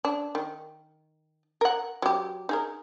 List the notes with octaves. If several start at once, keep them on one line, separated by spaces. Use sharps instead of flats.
D4
D#3
A#4 F#5
F#3 G4
D#4 G#4 A#4